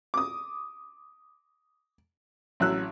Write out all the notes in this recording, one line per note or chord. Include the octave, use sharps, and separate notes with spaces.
D6 D#6
A1 F#3 C#4 E6 F#6